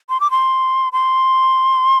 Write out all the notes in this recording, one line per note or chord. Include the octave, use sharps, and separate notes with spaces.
C6
D6
C6
C6